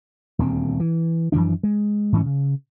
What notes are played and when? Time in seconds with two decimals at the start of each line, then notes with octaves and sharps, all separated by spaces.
0.39 D#1 D2 C4
0.80 E3
1.32 F#2 E3 F3 D4
1.63 G#3
2.12 G#2 E3 A#3 C#4
2.26 C#3